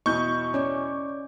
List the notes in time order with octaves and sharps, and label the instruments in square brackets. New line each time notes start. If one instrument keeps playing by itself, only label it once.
[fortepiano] E2 B2 [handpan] D#5 [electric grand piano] C#6 G6
[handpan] C#4 [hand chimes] C#5 D5 D6